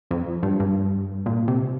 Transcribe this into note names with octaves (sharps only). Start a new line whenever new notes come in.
F2
G2
G2
A#2
C3